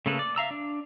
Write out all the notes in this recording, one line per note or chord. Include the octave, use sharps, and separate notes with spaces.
C#3 A3 A#3 A4 B4
D5
E5 F5 A#5 E6
D4